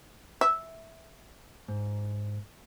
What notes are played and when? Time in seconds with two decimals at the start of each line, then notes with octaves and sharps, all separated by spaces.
0.41 E5
1.68 G#2